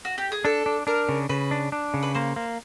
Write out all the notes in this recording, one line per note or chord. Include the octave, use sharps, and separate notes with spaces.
F#4
G4
G#4
D4 A4
D4
D4 A#4
C#3
C#3 B4
D4
D4
C#3
B4
A#3 C5
A#3